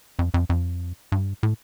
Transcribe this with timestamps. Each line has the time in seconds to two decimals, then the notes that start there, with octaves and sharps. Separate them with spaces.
0.19 F2
0.34 F2
0.49 F2
1.12 G2
1.43 A2